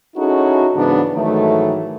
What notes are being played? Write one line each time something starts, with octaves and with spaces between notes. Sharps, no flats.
C#4 D#4 E4 F#4 G#4 A4
G#2 C#3 E3 F#3 B3 D4
G#2 D#3 E3 F#3 A3